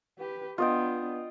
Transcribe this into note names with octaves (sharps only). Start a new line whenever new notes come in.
G4 B4
B3 D4 F4 D#5 G5